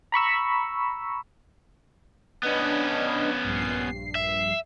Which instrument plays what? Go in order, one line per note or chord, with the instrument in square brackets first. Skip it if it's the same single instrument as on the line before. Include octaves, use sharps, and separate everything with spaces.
[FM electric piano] A#5 B5 C#6 E6
[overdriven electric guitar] B3 C#4 [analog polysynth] D4 B4 D#5
[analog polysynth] A#1 G2 C7
[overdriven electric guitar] E5